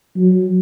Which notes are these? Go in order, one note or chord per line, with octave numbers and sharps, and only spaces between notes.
F#3